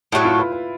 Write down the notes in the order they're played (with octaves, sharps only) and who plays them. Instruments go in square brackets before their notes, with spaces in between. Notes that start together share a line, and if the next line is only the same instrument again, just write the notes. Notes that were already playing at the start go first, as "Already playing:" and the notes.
[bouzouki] A2 F#3 A3 [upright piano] E4
[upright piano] F4
B4
B4